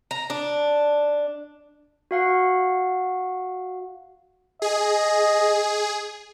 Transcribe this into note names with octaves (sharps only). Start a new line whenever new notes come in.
A#5
D4
F#4 F5 F#5
G#4 D#5